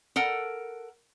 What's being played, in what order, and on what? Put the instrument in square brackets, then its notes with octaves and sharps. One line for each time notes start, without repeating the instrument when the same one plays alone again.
[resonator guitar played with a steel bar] A4 A#4 F#5